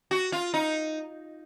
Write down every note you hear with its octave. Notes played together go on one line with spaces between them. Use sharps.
F#4
F4
D#4